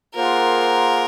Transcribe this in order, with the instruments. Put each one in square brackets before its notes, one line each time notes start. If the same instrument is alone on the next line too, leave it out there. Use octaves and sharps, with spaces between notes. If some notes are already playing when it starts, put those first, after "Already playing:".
[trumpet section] A#3 F4 G#4 C5 F#5 [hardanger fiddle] A#4